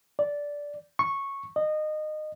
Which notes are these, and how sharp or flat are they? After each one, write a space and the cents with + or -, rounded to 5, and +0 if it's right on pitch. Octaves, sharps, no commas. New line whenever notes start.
D5 -10
C#6 -10
D#5 -20